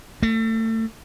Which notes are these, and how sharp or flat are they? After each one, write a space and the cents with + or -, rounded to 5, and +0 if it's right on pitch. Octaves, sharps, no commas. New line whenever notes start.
A3 +30